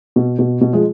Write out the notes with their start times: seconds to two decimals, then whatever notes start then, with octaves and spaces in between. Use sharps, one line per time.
0.16 B2
0.39 B2
0.61 B2
0.73 F3 G#3